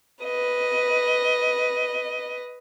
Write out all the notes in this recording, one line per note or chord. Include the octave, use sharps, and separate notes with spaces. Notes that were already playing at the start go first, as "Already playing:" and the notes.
B4 D#5